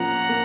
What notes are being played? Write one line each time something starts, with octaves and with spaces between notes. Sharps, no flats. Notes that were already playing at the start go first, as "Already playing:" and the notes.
Already playing: F3 A#3 C#4 F#5 A#5
A#3